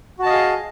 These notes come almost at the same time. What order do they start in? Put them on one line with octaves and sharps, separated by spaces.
F#4 A5 D#5 F5 G#4